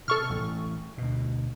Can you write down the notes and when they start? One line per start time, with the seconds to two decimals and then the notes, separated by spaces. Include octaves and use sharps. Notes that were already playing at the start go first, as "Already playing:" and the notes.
0.08 C3 A4 C#6 F6
0.30 A1
0.98 D2 B2